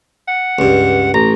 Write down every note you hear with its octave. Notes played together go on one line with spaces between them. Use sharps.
F#5
C#2 G2
A1 A#5